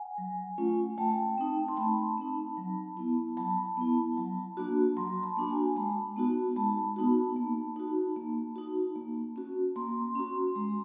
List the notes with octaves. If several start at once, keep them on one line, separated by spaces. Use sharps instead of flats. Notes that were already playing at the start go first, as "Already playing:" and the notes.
Already playing: F#5 G#5
F#3
A3 C#4 F4
A3 G5 A5
C4 D#4
C6
A3 A5 B5
C4 D#4
F#3
B3 E4
F#3 A5 B5
B3 E4
F#3
A#3 D4 F#4
F#3 A#5 C6
A5 B5
A#3 D4 F#4
G#5 A#5
G#3 A5 B5
B3 D#4 F#4
G#3 A5 B5
B3 D#4 F#4
A#3
D#4 F#4
A#3
D#4 F#4
A#3
C#4 F#4
A#3 A#5 C6
C#4 F#4
G#3